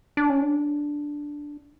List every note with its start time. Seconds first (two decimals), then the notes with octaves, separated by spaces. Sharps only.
0.17 D4
0.30 C#4
0.42 D4